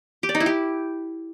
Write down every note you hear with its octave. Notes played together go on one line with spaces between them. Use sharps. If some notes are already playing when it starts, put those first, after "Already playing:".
G4
D5
D#4
E4
G4